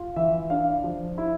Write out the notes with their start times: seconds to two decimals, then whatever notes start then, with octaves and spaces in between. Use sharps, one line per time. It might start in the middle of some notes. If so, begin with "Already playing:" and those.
Already playing: F4
0.16 E3 E5
0.50 D4 F5
0.84 F3
1.18 E4